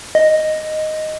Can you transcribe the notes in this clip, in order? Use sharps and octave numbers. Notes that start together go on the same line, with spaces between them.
D#5